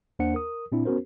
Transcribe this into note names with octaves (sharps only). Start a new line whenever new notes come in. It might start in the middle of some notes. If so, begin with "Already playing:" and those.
D#2 A#3 D4 C5 F#5 C#7
A#4 D#6
A#2 C4 D4 E4
B3 C#4 F#4 A#4 C5